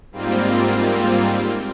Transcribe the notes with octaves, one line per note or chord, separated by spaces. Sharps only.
G#2 G3 A#3 C4 F4